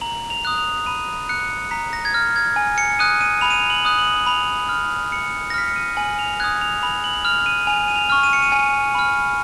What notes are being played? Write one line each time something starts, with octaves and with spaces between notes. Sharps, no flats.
A#5 F#7
F7
D#6 F#6
F7
B5 D#7
F#6 C#7
A#5 B6
A#6
G#6
F6 A#6
G#6
G#5
C#7
D#6 F#6 D#7
D#7
B5 F7
D#7
F7
F#7
D#6 F#6
F#7
F#7
B5 F7
F6
B5 C#7
A#6
F6 B6
C#7
D#7
G#5 F#7
F7
D#6 F#6 G#6
F7
B5 F7
F#7
F6 F7
D#7
G#5 F7
D#7
F7
C#6 F6
D#7
C#7
D#7
G#5
B5 F6